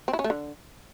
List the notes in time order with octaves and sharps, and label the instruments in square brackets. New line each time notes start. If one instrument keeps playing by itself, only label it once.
[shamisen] C4
E4
C#4
A3
D3